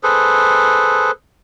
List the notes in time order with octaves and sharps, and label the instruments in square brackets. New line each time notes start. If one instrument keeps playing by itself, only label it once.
[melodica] G#4 A4 B4 C5